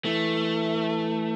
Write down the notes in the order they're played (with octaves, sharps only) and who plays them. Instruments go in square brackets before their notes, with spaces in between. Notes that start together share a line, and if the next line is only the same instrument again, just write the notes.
[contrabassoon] E3 [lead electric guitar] A3